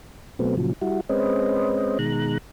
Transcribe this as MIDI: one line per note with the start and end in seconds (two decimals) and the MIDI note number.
0.39 0.56 47
0.39 0.56 54
0.39 0.56 57
0.39 0.56 59
0.39 0.56 60
0.57 0.73 46
0.57 0.73 49
0.57 0.73 53
0.57 0.73 54
0.81 1.01 55
0.81 1.01 64
0.81 1.01 66
1.09 1.98 56
1.09 1.98 60
1.09 1.98 61
1.09 1.98 71
1.09 1.98 72
1.09 1.98 75
1.99 2.38 47
1.99 2.38 51
1.99 2.38 56
1.99 2.38 82
1.99 2.38 90